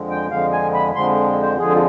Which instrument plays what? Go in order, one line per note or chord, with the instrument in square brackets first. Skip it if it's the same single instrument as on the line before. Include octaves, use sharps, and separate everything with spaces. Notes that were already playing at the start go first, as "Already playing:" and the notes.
Already playing: [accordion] F2 D3 F3 G#3
G5
F2 D3 F3 G#3 F5
G#5
B5
F2 D3 F3 G#3 C6
C5
F2 D3 F3 G#3 G#4
F4